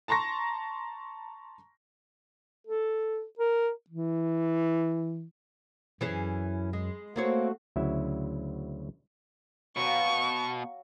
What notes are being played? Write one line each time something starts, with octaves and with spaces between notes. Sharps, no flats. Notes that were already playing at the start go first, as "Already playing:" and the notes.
A5 A#5 C6 C#6 A#6
A4
A#4
E3
F#2 E3 C#4 G#4
G#3
A3 A#3 C4 F#4 C#5
D2 C#3 F#3 E4 E5
B2 F#3 F5 G#5 C#6